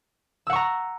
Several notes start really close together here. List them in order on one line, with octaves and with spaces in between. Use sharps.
E6 F#5 C#6 A#5